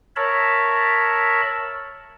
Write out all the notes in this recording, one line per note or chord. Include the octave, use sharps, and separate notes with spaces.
A#4 C#5 E5 A5 B5